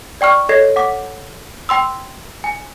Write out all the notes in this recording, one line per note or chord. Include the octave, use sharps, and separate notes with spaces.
D5 G5 C#6 F6
A4 C#5 D#5 G#6 A#6 C7
F#5 D6
G5 C6 E6
G#5